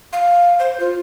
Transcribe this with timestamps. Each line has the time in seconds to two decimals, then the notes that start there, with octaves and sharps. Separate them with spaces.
0.13 F5
0.59 C5
0.80 F4